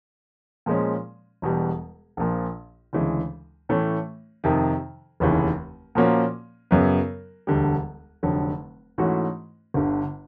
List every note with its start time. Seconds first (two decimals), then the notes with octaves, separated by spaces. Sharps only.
0.66 A#2 F3 G#3 C#4
1.42 E1 E2 B2 G3
2.17 A#1 A#2 F3
2.93 D2 C#3 E3 G#3
3.69 A2 E3 A3 C#4
4.44 F2 C3 D#3
5.20 F1 D#2 C#3 E3
5.95 A#2 F3 A#3 C#4 F#4
6.71 F#2 C#3 F#3 B3
7.47 E1 D2 D3 G3
8.23 F1 F2 D3 F#3
8.98 G#2 E3 A3 C#4 F#4
9.74 G1 G2 D3